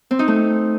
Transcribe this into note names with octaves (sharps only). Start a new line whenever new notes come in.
C4
D#4
A3